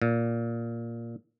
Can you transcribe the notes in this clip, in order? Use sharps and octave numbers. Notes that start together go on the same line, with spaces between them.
A#2